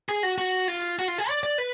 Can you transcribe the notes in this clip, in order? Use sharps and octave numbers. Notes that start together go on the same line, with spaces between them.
G#4
F#4
F#4
F4
F#4
F4
G#4
D5
D5
B4